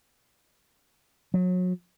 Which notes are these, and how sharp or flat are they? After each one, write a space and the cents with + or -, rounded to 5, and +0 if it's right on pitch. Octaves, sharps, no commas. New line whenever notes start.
F#3 -30